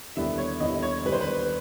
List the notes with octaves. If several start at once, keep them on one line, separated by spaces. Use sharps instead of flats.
D#2 D3 G3 B3 E4 E5
C#5
D#2 D3 G3 B3 E4 D#5
C#5
D#2 D3 G3 B3 E4 B4
C5
B4